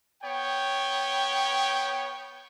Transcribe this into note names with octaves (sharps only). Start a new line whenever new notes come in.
B3 C#5 G5